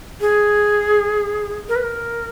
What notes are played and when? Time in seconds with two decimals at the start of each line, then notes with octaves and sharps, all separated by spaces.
0.21 G#4
1.69 A#4
1.76 B4
1.83 A#4